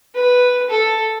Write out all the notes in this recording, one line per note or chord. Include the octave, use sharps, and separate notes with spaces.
B4
A4